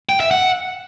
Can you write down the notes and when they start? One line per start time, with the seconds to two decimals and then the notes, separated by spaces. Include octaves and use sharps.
0.09 G5
0.20 E5
0.31 F#5